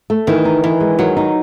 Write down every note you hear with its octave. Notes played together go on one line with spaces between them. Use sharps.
A3
D#3 E3
D#4
D#3 E3
G#3
D#3 F#3
D#4